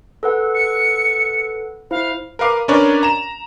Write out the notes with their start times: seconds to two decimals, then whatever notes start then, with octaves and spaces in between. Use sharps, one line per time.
0.23 A4 B4 F#5
0.55 C#7
1.91 E4 C5 F5
2.39 A#4 B4 F5 D6
2.68 C#4 D4 A#4 B4 C#5 D5
3.03 A#5 E7